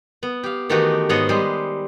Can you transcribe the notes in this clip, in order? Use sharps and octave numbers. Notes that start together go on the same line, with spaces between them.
B3
G4 F5
D#3 E3 A3 B3 F#4 G4
G#2 B3 C#5 D#5 A5
G3 G#3 B4 C5